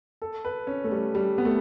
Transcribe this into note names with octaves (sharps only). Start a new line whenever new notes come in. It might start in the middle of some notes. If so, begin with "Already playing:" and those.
A4
B4
C#4
A3
G3
G3
B3
A3